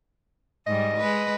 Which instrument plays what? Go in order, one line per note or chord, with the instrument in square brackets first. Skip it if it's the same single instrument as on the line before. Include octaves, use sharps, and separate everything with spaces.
[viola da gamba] G#2 G3 [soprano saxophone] D#5
[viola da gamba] G#3 B4